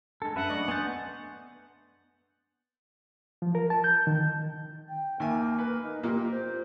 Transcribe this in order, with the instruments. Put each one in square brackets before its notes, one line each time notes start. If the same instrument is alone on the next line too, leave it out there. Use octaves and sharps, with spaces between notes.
[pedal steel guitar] G#3 A4 [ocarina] D4
[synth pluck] F#2 [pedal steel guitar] A4 B4 E5 [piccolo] F#5
[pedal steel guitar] A3 [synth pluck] D5 D#5 C#6
[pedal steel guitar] B3 G6 [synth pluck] G#5 C6 A6
[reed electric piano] F3
A#4
A5
G6
D#3
[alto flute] G5
[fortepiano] D#2 E5 G#5 [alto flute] A#3
[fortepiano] B4
[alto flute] D#4
[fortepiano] A#2 A#3 [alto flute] G4
[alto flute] C5